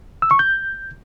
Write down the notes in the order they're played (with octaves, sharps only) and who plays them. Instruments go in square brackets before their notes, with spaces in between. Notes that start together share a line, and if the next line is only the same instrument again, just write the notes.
[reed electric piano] E6
C#6
G6